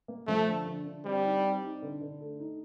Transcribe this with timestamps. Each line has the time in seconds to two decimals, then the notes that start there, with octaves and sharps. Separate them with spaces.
0.08 A#3
0.27 F3 A3
0.47 D3
0.66 D3
0.85 D3
1.05 G3 C4
1.24 D#4
1.43 C4
1.63 D#4
1.82 D3
2.01 D3
2.20 A3
2.40 D#4